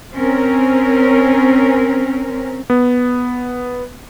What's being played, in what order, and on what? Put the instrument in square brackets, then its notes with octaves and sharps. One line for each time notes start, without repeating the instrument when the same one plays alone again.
[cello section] C4 C#4 A#4
[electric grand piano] B3